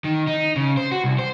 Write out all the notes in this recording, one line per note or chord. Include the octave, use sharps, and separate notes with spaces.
D#3
D#4
C#3
C5
F#4
C2
C5